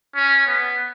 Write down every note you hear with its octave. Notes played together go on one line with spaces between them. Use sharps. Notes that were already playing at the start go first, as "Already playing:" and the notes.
C#4
B3